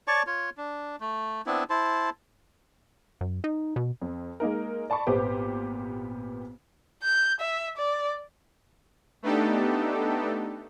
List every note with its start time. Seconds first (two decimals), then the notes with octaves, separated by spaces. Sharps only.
0.08 C#5 D5 A5 C#6
0.27 F4 C#5
0.57 D4
1.00 A3
1.46 B3 C4 D4 E4
1.70 E4 C5 A5
3.21 F#2
3.44 D#4
3.76 B2
4.02 F2
4.40 G#3 A#3 D#4 A#4
4.90 D5 A5 B5 C#6
5.07 G#1 A#2 B3 G4 C5 D6
7.03 G6
7.41 E5
7.77 D5
9.22 A3 B3 D4 D#4 G4 A4